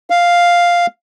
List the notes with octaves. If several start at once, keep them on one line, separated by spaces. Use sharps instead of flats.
F5